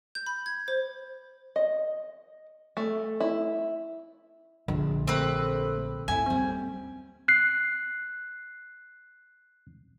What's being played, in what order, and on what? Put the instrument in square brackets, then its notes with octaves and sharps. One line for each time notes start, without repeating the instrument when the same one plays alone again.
[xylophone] G6
B5
G#6
C5
[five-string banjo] D#5
A3
E4
[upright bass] A#1 [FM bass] D3 [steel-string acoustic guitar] D4
[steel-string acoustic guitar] A3 A#3 G4 [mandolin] C4 B4
[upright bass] D#2 [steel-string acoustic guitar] A2 E4 [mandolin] G#5
[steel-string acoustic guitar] G3 C#4 [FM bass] C4
[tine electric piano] F#6 C7